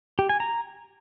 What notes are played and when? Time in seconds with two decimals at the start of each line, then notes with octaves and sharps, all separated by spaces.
0.19 G4
0.29 G#5
0.40 A#5